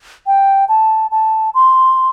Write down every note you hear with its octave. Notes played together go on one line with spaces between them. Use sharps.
G5
A5
A5
C6